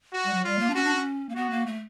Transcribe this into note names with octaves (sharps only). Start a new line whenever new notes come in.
F#4
G3
F#3
G3 F4
A#3
D4
C#4 F#4
D4
C#4
A#3
B3 F#4
A#3
A3